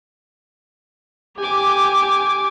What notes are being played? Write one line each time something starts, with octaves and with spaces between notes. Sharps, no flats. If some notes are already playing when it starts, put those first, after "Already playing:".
G4 G#5 D6